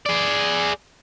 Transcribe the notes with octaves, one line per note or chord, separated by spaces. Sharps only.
G#4 D5